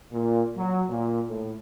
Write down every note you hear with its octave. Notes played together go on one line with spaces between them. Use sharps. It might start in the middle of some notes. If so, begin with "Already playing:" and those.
A#2
F#3
A#2
A2